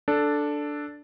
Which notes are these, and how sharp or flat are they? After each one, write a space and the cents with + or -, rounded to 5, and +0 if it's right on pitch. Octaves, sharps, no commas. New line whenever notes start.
D4 +0 A4 +0